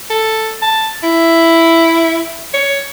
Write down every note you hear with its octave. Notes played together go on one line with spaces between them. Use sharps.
A4
A5
E4
C#5